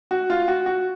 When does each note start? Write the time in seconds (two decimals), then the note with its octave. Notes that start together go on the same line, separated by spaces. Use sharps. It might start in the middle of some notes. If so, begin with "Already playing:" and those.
0.11 F#4
0.30 F4
0.48 F#4
0.66 F#4